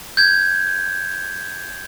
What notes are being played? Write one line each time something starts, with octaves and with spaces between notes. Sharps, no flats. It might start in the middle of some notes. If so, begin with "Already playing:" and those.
G6 G#6